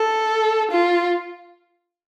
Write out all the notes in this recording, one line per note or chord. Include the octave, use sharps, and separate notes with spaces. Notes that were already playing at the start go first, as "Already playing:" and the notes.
Already playing: A4
F4